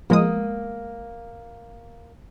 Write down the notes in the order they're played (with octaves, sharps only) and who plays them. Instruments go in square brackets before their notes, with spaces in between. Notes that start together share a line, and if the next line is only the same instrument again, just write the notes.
[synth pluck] F3 G#3 D#6 [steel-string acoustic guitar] A#3